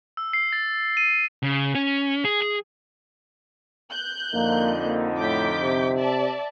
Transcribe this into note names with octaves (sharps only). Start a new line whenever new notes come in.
E6
C7
A6
D#7
C#3
C#4
G#4
G#4
F#6 G6
F2 D3 A#3 D#4
A#3
A2 D6 G6 B6
C3
D5 E5 A5